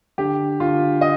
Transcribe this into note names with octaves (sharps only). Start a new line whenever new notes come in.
D3 G4
D3 F4
D#5